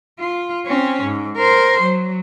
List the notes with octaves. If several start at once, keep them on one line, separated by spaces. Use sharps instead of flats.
F4
C4 C#4
G#2
A#4 C5
F#3